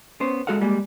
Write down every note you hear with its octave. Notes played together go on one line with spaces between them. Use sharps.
B3 C#4 C5
G#3 F#4 A4 F5 F#5
G3 G#3 A#3